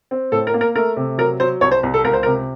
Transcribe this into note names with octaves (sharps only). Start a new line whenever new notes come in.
C4
A2 A4
A#4
A#3
A#4
A3 A#4
C3
F#3 A#4
F#3 C5
C2 C#5
C5
C2
A4
C#2 A#4
C5
A#4
C3